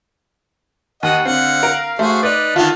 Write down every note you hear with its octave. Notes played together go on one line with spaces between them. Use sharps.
D#2 D#5 F#5
D3 C4 F5 F#5
A#4
A3 F#4 G#4 C5
D#4 B4 D5
D3 D#3 F4 F#5 A5